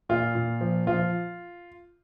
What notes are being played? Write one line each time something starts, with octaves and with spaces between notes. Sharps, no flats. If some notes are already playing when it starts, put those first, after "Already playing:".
A#2 F4
A#2
F3
F3 F4